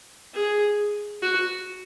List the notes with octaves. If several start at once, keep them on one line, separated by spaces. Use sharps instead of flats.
G#4
F#4